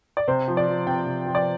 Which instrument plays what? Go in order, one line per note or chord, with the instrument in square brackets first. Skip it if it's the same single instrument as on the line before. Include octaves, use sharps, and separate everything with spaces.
[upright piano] D5
C3 C5
F3
D5
F3
C3 G5
C3
F3
D5